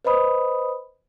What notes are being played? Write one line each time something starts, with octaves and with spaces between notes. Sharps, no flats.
B4 C5 D#5 B5 D#6